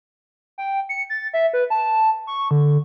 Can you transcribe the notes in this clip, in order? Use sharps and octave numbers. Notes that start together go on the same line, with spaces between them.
G5
C#7
A6
E5
B4
A5
C#6
D3